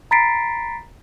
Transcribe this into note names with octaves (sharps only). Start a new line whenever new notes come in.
A#5 B5 A6 B6 C7 D7